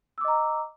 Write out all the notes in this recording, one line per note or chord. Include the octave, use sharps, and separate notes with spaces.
D#5 A#5 D6 E6